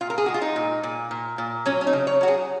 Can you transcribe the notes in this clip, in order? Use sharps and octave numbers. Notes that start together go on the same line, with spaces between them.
A#2 F4
A#4
G#4
G#3 F#4
F4
D#4
A#2
A#2
A#2
A#2
F#3 C#4
C#4
D#4
C#3
C#5
F#3 F#4
G#4